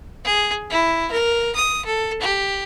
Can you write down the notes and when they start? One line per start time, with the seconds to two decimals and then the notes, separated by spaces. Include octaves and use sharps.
0.25 G#4
0.70 E4
1.11 A#4
1.55 D#6
1.85 A4
2.21 G4